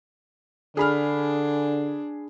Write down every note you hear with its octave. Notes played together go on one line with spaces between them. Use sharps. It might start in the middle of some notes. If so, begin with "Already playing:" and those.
D3 D4 G#4 B5 F6